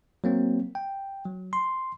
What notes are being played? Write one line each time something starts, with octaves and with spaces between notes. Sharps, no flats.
F#3 A#3 C4
G5
F#3
C6